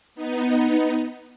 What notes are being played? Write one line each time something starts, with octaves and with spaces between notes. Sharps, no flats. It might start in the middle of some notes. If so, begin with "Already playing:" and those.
B3 D#4